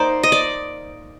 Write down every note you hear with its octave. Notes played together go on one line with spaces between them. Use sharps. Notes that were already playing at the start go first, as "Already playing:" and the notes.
Already playing: A#3 D#4 C5 D5
D#5
D5